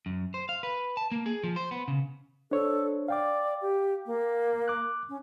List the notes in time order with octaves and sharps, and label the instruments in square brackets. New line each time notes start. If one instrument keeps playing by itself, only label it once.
[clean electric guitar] F#2
C5
F5
B4
A5
A#3
G#4
F3
C5
B3
C#3
[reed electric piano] D4 C5 C#5 [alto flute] A4
[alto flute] D5 [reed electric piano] F5 G5 D6
[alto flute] G4
A#3
[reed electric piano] D6 F#6
[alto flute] C#4